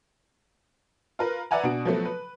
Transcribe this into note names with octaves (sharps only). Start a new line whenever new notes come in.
F4 A#4 B4
B4 D5 E5 F#5 G#5 A#5
B2 D4 F#4 D7
F3 F#3 A3 B3
B4